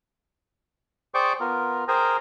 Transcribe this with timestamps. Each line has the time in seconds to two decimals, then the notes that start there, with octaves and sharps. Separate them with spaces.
1.14 G#4 C5 D5 G5 C#6 D6
1.40 B3 F4 A#4
1.88 G#4 A#4 C5 G5 G#5 A#5